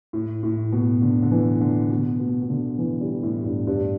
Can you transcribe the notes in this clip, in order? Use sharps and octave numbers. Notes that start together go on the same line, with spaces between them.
A2
A2
B2
D3
D3
E3
D3
B2
B2
B2
D3
E3
G3
A2
G2
G2